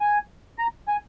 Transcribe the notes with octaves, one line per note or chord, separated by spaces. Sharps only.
G#5
A#5
G#5